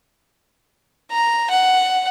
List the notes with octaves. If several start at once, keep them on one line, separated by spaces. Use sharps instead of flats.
A#5
F#5